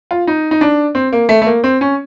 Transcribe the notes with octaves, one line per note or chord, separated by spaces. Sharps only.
F4
D#4
D#4
D4
C4
A#3
A3
A3
A#3
C4
C#4